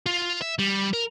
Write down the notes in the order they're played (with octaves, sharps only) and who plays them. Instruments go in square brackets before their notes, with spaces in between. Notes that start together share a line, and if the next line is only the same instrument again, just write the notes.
[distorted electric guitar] F4
E5
G3
A#4